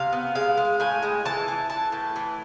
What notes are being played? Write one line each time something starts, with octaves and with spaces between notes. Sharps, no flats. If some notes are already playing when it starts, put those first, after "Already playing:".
Already playing: C3 F5
B3
G#3 F5
G#3
A2 G#5
G#3
E3 A5
E3
E3 A5
A2
E3